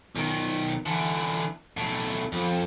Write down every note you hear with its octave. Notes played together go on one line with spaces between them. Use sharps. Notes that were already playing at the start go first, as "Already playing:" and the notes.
B1 D#3
D3 E3
B1 A2
F2